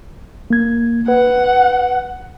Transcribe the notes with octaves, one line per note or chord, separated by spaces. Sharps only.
A#3 G#6
B4 F#5